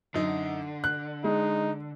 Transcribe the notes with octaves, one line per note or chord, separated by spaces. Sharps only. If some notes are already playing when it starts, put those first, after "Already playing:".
F#2 D3 D#4
F#6
G#3 D#4